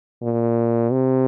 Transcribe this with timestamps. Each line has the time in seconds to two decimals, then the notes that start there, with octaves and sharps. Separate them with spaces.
0.23 A#2
0.92 C3